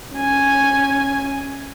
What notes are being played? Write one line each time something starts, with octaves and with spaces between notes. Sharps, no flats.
C#4 G#5